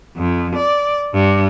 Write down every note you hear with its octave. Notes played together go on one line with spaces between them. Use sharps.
F2
D5
G2